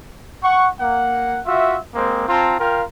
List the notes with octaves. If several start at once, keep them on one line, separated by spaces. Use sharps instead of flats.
F#5 C#6
A#3 F#5
F4 F#4 E5
G#3 A#3 C4
C4 F4 A5 A#5
F4 A#4 F5 G5